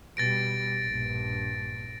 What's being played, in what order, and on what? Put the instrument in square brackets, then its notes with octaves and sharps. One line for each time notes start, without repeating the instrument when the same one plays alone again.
[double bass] B2 G3 [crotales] A6 A#6 D7
[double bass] A#1 G2